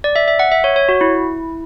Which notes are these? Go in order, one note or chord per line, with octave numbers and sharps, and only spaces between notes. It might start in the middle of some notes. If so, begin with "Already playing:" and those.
D5
E5
E5
F#5
E5
C#5
C#5
F#4
E4